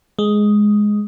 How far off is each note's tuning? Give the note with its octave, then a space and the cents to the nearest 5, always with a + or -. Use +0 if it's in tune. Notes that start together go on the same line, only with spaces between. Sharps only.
G#3 +5